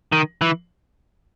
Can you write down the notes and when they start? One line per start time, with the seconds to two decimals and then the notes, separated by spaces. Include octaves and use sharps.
0.12 D#3
0.41 E3